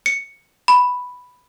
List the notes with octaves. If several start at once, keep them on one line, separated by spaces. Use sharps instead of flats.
C#7
B5